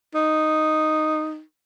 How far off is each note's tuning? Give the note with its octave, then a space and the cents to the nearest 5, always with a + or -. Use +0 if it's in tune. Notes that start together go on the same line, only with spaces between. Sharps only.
D#4 -5